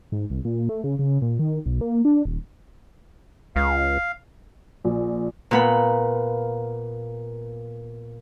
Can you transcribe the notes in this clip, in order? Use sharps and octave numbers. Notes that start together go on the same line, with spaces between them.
G#2
C2
A#2
A3
C#3
C#3
A#2
D#3
B1
A#3
D4
D#1
C#2 F5
A#1
A#2 B3 B5